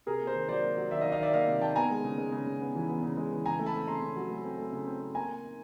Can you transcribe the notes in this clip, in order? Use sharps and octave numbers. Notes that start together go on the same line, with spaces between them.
C3 G#4 A#4
A#3
A#4 C5
D#3
F#3 C5 D5
A#3
F#3
D#3 D5 E5
D#5 F5
D#3
D#5 F5
D#3 D5 E5
A#3 D#5 F5
C3
D#3 G5 A5
B3 G#5 A#5
G#3
C#3
G#3
C#3
C#3
B3
E3
B3
C#3
G#3
E3
C#3 G#5 A#5
A3
A5 B5
C4
C#3 A#5 C6
C#3
F#3
A3
C4
A3
C#3
C4
C4
A#3 G#5 A#5
A#3
D#4